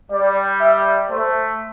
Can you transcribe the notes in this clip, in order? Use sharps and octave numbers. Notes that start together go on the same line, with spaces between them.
G3 D5
E5
A3 C5